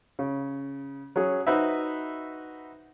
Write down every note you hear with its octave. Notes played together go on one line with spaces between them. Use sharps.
C#3
F#3 C#4 G#4 C#5
D#4 F#4 B4 C5 E5